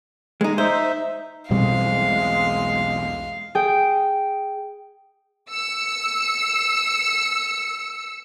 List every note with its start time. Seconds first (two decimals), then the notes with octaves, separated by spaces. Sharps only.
0.41 G#3 D#4
0.58 D#4 C5 E5
1.51 B1 E2 B2 G3 G#3 C4 F5
3.55 G#4 G5
5.49 E6 C#7